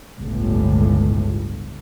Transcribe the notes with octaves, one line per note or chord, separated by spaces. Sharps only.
G1 C#2 A2